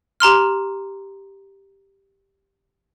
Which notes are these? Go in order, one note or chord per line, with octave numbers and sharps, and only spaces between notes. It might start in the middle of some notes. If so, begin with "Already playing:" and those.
G4 A#5 C6 F6